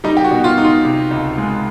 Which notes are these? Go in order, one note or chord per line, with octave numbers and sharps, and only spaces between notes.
G3 D#4
G4
F#4
B2
F4
D#4
F4
C3
C#2
G#3